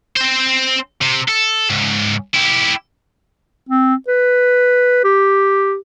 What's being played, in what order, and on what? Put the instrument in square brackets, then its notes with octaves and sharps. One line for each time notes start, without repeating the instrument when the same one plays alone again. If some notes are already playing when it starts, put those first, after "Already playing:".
[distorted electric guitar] C4 C5
C3
A4
C#2 G#2
E4 G4
[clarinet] C4
B4
G4